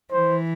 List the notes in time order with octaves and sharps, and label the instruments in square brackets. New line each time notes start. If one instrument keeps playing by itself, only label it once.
[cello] E3 [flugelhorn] C5